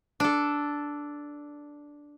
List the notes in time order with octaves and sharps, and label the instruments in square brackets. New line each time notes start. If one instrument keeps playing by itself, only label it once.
[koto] D4 A4